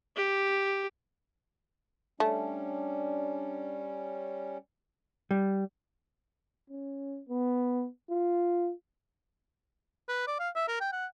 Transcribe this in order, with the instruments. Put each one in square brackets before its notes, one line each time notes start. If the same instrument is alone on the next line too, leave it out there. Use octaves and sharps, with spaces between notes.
[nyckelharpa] G4
[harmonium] G3 C#4 [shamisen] A3 [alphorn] D4
[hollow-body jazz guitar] G3
[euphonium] C#4
B3
F4
[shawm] B4
D5
F5
E5
A#4
G5
F#5